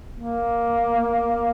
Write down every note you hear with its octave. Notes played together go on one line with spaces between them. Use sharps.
A#3